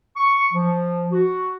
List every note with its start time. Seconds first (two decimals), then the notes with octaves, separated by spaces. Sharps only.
0.16 C#6
0.53 F3
1.12 F#4